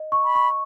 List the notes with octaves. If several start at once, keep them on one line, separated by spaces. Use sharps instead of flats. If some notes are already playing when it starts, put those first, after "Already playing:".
Already playing: D#5
C#6
B5
C#6